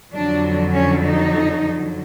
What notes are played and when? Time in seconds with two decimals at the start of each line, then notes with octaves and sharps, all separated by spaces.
0.13 F2 D3 F#3 D4
0.73 C#4
1.03 D#4